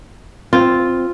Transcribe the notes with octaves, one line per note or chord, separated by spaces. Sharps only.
C4 F4